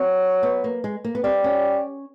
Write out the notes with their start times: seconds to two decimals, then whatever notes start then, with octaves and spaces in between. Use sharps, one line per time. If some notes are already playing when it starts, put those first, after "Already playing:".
Already playing: F#3 C4
0.43 B3
0.64 A#3
0.84 G#3
1.05 A#3
1.15 B3
1.24 G3 C4
1.44 C#4